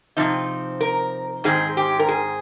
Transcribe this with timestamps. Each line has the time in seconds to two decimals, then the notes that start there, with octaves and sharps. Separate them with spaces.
0.17 C3 F3 C4 D#4
0.81 A#4
1.44 G#2 D#3 G#3 C4 G#4
1.77 G4
1.99 A#4
2.08 G#4